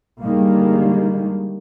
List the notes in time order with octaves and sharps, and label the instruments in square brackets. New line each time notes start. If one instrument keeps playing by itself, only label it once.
[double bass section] D3 D#3 G3 G#3 A#3